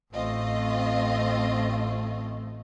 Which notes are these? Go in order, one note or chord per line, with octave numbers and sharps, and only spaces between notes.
A1 A3 C4 F4 D#5